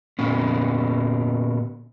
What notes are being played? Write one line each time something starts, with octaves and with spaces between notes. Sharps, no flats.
A#2 B3 C#4